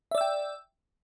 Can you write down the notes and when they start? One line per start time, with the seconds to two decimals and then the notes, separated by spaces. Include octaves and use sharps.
0.11 E5
0.15 D5
0.18 E6
0.21 G5